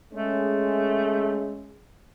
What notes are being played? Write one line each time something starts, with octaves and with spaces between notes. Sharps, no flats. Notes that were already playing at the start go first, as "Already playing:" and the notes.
G#3 A3 C#4